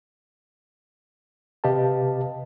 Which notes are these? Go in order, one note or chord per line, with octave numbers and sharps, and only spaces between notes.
C3 G4 B4 D#5 F5 A5